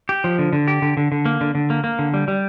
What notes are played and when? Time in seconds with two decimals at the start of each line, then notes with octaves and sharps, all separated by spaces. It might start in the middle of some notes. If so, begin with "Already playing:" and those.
0.09 G4
0.24 F3
0.39 D3
0.53 D3
0.68 G4
0.82 D3
0.97 D3
1.12 D3
1.25 A#3
1.41 D3
1.55 D3
1.70 A#3
1.84 A#3
1.99 D3
2.14 G3
2.28 G3